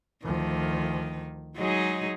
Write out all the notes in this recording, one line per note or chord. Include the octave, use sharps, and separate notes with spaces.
D2 D#3 F3
F#3 G#3 D#4 G#4